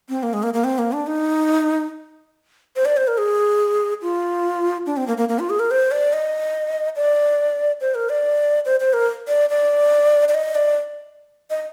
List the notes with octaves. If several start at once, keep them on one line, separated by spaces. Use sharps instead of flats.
C4
A#3
G#3
A#3
A#3
C4
A#3
D4
D#4
C5
D5
C5
A#4
G#4
F4
D4
C4
A#3
A#3
A#3
F4
G#4
A#4
C5
D5
D#5
D5
C5
A#4
D5
C5
C5
A#4
D5
D5
D5
D#5
D5
D#5